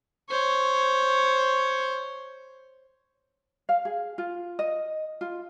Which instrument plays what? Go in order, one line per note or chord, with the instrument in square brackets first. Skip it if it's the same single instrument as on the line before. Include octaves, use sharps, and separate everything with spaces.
[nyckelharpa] C5 C#5
[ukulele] F5
G#4
F4
D#5
F4